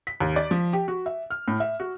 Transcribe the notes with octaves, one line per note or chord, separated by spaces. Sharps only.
B6
D#2
D5
F3
G4
F#4
E5
F6
A2
E5
F#4